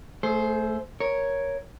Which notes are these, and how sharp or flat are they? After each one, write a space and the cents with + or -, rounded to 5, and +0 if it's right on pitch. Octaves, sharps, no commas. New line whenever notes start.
A3 +0 G#4 +40 C5 +0
A#4 +0 C#5 +0